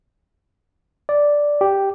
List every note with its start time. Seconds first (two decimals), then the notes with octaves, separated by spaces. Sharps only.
1.09 D5
1.61 G4